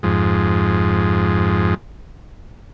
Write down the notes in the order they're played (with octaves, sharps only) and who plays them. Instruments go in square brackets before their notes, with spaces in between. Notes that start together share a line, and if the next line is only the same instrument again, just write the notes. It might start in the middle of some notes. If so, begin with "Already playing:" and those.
[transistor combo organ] F2 G#2